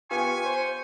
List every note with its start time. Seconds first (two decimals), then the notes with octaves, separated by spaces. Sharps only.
0.11 B3 F4 G4 G#5 C#6
0.45 C5